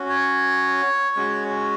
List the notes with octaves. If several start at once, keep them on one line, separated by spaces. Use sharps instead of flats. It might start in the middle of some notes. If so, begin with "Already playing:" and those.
Already playing: C#4 F#4
C#5
G#3 C#4 F#4